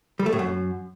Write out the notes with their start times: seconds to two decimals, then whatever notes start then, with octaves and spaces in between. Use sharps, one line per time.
0.19 G3
0.26 A3
0.33 A2
0.39 F#2